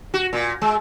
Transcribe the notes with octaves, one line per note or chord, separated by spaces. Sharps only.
F#4
A#2
G#3